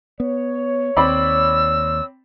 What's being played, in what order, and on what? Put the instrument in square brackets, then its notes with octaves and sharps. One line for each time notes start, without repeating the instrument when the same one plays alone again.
[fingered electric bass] B3 [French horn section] C#5
[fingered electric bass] D#2 [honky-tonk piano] C4 D5 B5 [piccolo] E6